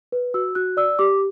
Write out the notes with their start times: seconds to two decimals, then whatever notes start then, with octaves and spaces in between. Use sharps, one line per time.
0.12 B4
0.34 F#4 E6
0.55 F#4 F#6
0.77 D5 E6
0.99 G4 D6